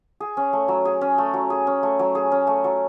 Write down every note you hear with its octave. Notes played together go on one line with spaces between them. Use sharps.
G#4
C#4
A3
F#3
G#4
C#4
A3
F#3
G#4
C#4
A3
F#3
G#4
C#4
A3
F#3